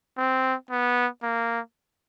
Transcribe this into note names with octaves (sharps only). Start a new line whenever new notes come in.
C4
B3
A#3